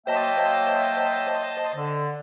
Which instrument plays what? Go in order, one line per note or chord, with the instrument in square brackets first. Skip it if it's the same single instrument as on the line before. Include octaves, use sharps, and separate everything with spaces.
[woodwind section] F#3 A#3 E5 [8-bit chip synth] C5 D#5 A5 [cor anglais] G5
[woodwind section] D3